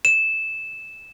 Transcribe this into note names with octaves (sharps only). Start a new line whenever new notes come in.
E7